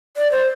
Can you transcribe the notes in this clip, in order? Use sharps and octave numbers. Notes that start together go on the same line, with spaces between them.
D5
C5